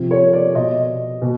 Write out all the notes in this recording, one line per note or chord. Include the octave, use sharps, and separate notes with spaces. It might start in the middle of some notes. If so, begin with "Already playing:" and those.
Already playing: C3 F3
C#5
D5
B2 D#5
B2